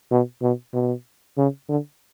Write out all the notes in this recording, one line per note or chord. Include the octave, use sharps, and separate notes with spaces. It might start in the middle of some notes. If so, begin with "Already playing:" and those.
B2
B2
B2
C#3
D3